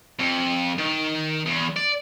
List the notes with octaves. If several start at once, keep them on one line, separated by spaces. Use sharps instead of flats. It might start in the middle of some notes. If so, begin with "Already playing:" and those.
F2
D#3
E2
D5